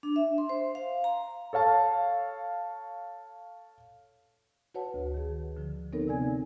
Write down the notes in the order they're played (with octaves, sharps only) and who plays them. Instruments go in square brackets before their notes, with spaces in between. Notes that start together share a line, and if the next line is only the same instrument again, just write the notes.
[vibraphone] D4
E5
C6
C5
F5
A#5
[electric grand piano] A4 C#5 F5 A5
[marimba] F#4 B4 C#5 F#5 A5
D2
D#3 G#4
D3 F3
B3 C4 D#4 A4 A#4 C#5
C3 D5 G#5 G#6